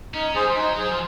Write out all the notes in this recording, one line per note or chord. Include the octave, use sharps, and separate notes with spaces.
C#4 D#4
G3 G#4 C5
F#3 D#4
G#4 C5
F3